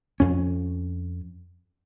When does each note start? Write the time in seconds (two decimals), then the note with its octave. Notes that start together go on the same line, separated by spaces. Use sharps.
0.20 F2 C#4